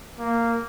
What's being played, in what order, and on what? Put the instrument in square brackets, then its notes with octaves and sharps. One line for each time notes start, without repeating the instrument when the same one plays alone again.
[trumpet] A#3